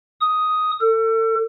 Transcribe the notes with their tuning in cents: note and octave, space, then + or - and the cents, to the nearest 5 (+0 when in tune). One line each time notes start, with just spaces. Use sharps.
D#6 +5
A4 +35